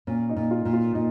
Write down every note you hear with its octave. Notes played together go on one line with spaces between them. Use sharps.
A#2 C#4
D#4
A#2
F4
A#2
F4
A#2 D#4